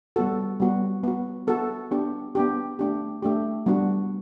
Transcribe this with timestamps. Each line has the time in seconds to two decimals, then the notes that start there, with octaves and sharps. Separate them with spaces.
0.16 G3 B3 F#4 A4
0.60 G3 B3 F#4
1.04 B3 F#4
1.47 B3 F#4 A4
1.91 B3 D4 G4
2.35 B3 D4 G4
2.79 A3 D4 G4
3.23 A3 D4 G4
3.66 G3 B3 D4 F#4